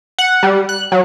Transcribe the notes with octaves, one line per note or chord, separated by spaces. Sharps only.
F#5
G3
F#6
F#3